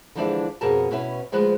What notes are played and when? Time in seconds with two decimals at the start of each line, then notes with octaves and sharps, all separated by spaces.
0.15 D3 E3 F3 G#3 D4 E4
0.61 F2 B2 G#4 A#4 G#5 A5
0.91 B2 C#4 E4 B4
1.32 D2 F3 G#3 B4